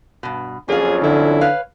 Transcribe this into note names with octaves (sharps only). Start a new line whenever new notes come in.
G2 B2
F2 F#3 A#3 C#4 F4 G#4
D3 E4
B4 C#5 F5